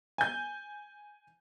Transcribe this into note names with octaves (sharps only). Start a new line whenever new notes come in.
G#5 G6